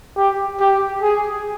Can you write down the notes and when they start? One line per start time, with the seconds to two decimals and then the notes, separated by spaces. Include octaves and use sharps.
0.17 G4
0.60 G4
1.02 G#4